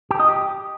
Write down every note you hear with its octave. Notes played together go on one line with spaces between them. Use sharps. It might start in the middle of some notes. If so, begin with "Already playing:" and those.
G4
D#5
G4